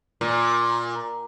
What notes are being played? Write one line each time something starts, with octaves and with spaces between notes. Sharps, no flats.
A#2